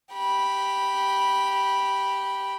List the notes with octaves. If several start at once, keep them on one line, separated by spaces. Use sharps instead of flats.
G4 B5